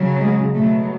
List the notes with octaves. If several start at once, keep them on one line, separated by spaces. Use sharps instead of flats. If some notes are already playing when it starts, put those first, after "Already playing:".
Already playing: C#3 F#3
G#3
B2 F#3 A3